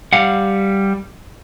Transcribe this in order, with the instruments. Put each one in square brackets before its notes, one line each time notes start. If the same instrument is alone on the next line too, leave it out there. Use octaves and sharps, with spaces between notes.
[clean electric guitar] G3 F5 F#5